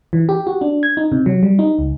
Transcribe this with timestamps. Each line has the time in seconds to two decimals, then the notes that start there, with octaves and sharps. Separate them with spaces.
0.13 E3
0.29 G4
0.47 F#4
0.61 D4
0.83 G#6
0.97 D#4
1.12 C3
1.26 F#3
1.43 G3
1.59 D#4
1.79 C#2